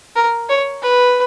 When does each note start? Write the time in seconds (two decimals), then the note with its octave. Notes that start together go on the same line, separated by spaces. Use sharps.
0.16 A#4
0.49 C#5
0.82 B4